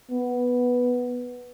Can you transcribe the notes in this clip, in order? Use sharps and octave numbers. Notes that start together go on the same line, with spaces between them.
B3